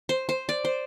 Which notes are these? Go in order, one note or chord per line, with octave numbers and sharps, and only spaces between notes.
C5
C5
D5
C5